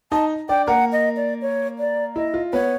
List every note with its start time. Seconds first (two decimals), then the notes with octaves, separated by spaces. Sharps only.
0.12 D#4 D#5 A5
0.49 D4 D5 G5
0.67 A#3 A#4 F#5
0.92 D#5
1.16 D5
1.42 C#5
1.79 D5
2.16 E4 D#5
2.34 F4
2.53 B3 B4 C#5